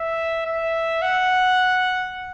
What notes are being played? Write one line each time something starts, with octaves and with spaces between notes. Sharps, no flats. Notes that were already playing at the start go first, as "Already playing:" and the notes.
Already playing: E5
E5
F#5